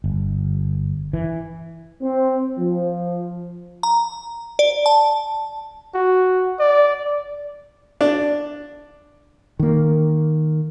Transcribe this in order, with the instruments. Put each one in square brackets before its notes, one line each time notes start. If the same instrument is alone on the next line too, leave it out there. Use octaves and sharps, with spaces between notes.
[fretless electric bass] G1
E3
[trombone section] C4
F3
[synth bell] A#5
D5
A5
[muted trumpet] F#4
D5
[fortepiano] D4
[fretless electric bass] D#3 A#3